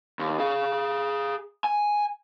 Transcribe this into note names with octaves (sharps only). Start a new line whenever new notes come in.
D#2
G#4 F5
G#5